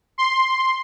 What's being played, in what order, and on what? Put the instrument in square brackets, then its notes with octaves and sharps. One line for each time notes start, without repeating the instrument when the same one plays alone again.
[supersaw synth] C6